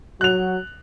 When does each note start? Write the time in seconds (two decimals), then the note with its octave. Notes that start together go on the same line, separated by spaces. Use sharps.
0.21 F#3 F#4 F#6 F7